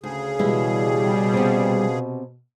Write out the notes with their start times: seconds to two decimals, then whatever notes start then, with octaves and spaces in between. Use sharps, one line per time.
0.03 D2 C#3 G#4
0.39 B2 E3 G3 G#3 E4
1.33 C3 B3